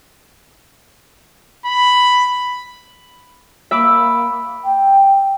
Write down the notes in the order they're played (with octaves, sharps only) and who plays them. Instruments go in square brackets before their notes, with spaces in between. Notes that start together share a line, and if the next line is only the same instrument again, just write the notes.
[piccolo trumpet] B5
[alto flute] A#3 [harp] E5 B5 D6
[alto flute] G5